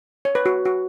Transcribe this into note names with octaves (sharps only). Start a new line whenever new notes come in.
C#5
B4
F#4
F#4